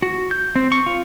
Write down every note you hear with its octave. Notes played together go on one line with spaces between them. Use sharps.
F#4
G6
C4
C#6
F4